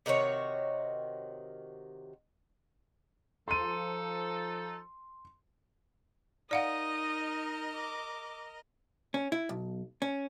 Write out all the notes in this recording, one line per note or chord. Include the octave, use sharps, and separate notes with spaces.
C3 D#3 F#4 C#5
F3 D#4 A4 C6 D#7
D#4 A#4 D5 D#5 F5 F#5 D#6
D6
C#4
E4
B1
C#4